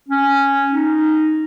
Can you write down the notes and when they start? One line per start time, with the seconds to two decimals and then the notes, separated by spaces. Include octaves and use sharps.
0.08 C#4
0.73 D#4